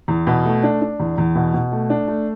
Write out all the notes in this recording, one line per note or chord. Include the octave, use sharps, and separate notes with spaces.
E2
B2
A3
D4
D4
E2
E2
B2
B2
A3
D4
A3